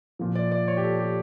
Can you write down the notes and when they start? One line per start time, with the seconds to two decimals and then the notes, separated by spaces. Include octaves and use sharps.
0.19 A#2 F3
0.35 D5
0.52 D5
0.68 C#5
0.77 G4
0.83 A4
0.99 G4